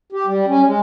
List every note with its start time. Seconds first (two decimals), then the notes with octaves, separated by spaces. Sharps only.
0.12 G4
0.27 G3
0.47 C#4
0.66 G#3